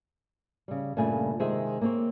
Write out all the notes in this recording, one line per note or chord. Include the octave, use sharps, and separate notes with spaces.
C#3 G3
G2 A#2 C#3 A3 G#5
C3 D#3 G#3 G#4 C5 E5
A#3 C4 C#5